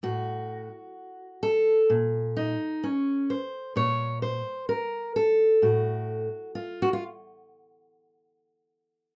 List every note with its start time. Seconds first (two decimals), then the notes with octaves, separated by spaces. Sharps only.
0.03 A2 F#4
1.43 A4
1.90 A#2
2.37 D#4
2.84 C#4
3.30 C5
3.76 A#2 C#5
4.22 C5
4.69 A#4
5.16 A4
5.62 A2 F#4
6.55 F4
6.82 F#4
6.93 F4